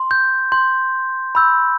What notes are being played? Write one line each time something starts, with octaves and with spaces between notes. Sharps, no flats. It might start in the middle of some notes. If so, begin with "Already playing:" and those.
Already playing: C6
G6
C6 G6
B5 E6 G6